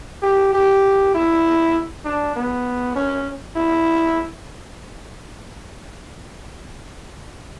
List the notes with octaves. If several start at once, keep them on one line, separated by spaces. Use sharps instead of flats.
G4
G4
E4
D4
B3
C#4
E4